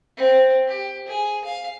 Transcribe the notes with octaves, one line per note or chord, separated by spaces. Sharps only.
C4
G4
G#4
F5